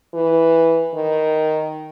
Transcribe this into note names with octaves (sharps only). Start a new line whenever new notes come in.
E3
D#3